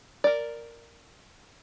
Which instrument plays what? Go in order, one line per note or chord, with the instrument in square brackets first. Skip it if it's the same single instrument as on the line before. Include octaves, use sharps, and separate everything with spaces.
[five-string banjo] A#4 D5